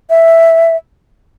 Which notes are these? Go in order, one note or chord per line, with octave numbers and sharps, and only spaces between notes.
E5